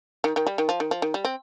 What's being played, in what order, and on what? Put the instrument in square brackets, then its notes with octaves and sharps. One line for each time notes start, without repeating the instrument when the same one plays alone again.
[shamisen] D#3
D#3
G3
D#3
F3
D#3
F3
D#3
G3
C4